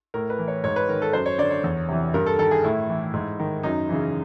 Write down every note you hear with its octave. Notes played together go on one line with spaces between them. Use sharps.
A2 A#4
B4
E3
C#5
G#2 C#5
B4
D#3 A#4
A4
F#2 C5
C#5
D3 D5
C#5
E2
C3 E3
G2 A#4
A4
D#3 A4
G#4
A2 E4
E3
G#2
D#3
F#2 D#4
C#3 E3